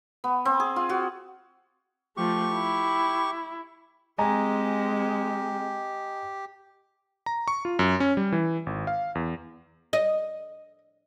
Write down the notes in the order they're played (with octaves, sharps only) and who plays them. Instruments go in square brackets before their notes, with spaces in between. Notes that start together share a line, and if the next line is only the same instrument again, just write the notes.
[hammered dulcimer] B3
C4
G#4
F4
F#4
[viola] F3 A3 [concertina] G4 C#6
[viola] E4
[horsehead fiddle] G#3 C4 [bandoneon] G4 [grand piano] D#5 G#5 A#5
[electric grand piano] A#5
C#6
F4
F#2
C#4
G3
E3
G#1
F5
E2
[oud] D#5